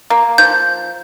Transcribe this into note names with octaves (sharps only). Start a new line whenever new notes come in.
A#3
F3 G6